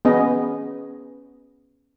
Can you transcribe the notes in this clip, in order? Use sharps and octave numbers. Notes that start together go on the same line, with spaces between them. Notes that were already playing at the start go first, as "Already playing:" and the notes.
B3 C#4 G#4 D#5